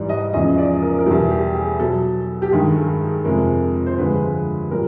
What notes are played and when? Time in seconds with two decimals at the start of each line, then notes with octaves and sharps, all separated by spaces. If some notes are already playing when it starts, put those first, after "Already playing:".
Already playing: G#2 E3 G3 D5
0.09 D#5
0.33 E2 C#3 F3 G#3 D#5
0.58 D5
0.82 A#4
0.99 A#4
1.06 E2 B2 G3 A4
1.31 G4
1.55 G#4
1.80 B2 F#3 A4
2.42 G4
2.52 G2 D#3 G#3 G#4
2.77 A4
3.01 G#4
3.25 F2 C3 F3 G#3 A#4
3.86 C5
3.98 G2 D3 F3 G#3 B4
4.71 A#2 G3 A#4